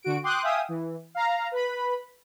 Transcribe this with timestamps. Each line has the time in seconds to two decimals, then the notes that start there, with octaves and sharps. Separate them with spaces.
0.03 D3 F#4 D7
0.23 G5 C6 D6 D#6 F#6 G6
0.43 E5 F5 G5 G#5 D#6 E6
0.69 E3
1.15 F5 A#5
1.51 B4 B5